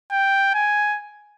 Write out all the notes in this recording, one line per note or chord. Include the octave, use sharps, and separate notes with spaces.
G5
G#5